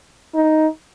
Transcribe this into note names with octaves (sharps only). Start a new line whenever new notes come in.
D#4